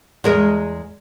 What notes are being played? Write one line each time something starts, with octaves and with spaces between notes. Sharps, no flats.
E2 G#3 A#4